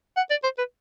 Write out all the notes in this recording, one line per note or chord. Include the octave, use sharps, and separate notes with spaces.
F#5
D5
C5
B4